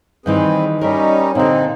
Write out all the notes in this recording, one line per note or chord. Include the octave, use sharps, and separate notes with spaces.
G2 D#3 E3 C4 G#4 B4
G3 C#4 D#4 A#4 D#5 E5
A#2 D3 C4 D#4